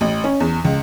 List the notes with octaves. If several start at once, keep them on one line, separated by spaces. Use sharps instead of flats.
A1
C#4
E2
C#2